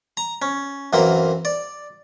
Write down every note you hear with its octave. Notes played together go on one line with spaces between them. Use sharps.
A#5
C#4
F#2 E3 A#3 C4
D5